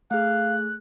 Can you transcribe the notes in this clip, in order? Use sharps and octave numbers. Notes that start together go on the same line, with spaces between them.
A3 G#4 F5 F#6